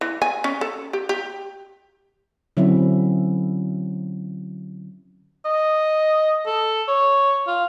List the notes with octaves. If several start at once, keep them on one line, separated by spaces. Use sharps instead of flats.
E3
G#5
C#4
A4
G4
G4
D3 F#3 C4 C#4 E4 E5
D#5
A4
C#5
F4